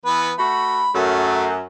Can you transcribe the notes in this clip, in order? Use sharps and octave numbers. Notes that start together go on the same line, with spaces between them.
E3 B3 B4
A3 F#4 B5
F#2 A3